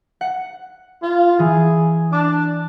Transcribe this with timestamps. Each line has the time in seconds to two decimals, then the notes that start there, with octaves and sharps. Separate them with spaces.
0.21 F#5
1.03 F4
1.39 E3 G#4
2.12 D4 D6